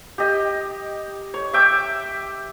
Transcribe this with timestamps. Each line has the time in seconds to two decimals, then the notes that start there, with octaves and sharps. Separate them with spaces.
0.18 G4 D#5
1.34 C#5
1.53 E5 G5 D6